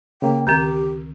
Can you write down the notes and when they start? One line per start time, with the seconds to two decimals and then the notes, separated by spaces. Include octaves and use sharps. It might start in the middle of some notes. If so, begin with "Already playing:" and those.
0.22 C#3 A#3 G5
0.47 C#2 D3 D#3 C4 G4